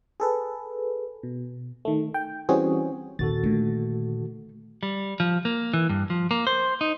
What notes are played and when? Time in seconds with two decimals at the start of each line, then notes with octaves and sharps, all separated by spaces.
0.20 G#4 A4 B4
1.23 B2
1.85 D#3 A3
2.14 G5
2.49 E3 G3 C4 C#4 F#4 G#4
3.19 D#1 D#3 F#4 A4 A6
3.43 A#2 D3 A3
4.83 G3
5.20 F3
5.45 A#3
5.74 E3
5.89 G2
6.10 F3
6.31 A#3
6.47 C5
6.81 D#4